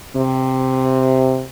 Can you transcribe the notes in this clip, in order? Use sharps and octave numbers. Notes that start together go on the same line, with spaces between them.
C3